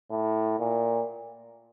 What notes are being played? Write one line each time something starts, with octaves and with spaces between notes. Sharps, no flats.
A2
A#2